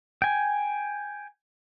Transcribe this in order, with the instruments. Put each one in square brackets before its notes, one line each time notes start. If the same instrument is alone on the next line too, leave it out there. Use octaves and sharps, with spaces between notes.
[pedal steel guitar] G5 G#5